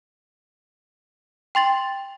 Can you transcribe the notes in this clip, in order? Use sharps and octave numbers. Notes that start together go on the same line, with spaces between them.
G5 C6 A6 F#7